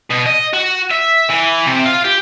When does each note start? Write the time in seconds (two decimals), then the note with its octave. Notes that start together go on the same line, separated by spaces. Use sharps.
0.10 B2
0.26 D#5
0.54 F#4
0.91 E5
1.30 E3
1.66 C3
1.85 F4
2.05 G4